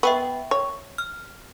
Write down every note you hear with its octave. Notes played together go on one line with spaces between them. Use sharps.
B3 E5 G5 C#6
C#5
F6